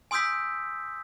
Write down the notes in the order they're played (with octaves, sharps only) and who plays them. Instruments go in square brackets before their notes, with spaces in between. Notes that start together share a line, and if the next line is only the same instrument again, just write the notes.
[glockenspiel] G#5 C6 D#6 E6 G6 B6